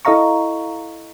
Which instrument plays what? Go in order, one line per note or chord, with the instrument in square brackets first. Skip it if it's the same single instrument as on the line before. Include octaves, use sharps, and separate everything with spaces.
[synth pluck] E4 A4 D#5 F5 A#5 C#6